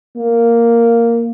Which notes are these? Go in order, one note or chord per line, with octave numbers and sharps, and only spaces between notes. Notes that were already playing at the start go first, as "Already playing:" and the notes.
A#3